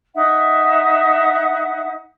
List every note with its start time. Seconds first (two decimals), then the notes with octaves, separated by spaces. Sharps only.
0.14 D#4 E5 F#5